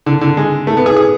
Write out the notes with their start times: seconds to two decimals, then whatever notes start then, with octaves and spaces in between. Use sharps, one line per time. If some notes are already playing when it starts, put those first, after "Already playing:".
0.06 D3
0.21 D3
0.37 G#3
0.67 A3
0.77 B3
0.86 G#4
0.97 G#4